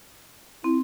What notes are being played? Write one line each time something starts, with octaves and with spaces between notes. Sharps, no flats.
C4 E4